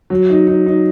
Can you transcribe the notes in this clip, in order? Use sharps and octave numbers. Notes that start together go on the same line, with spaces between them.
F#3
D#4
D#4
D#4